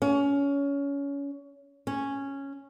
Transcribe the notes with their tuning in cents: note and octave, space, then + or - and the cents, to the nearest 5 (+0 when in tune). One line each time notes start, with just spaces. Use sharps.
C#4 +25
C#4 -5